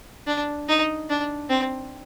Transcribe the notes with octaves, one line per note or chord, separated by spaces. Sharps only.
D4
D#4
D4
C4